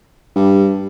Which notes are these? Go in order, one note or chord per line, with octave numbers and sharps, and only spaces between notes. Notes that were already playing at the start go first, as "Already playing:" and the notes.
G2